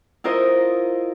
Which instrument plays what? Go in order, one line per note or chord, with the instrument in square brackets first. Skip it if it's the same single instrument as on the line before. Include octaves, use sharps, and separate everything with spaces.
[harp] E4 F4 A#4 C5 D#5